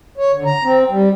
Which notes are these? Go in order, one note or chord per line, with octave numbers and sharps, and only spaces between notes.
C#5
D3
A#5
C4
G3